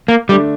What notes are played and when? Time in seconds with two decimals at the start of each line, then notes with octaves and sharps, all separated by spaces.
0.08 A#3
0.29 D3 G3 A3 D4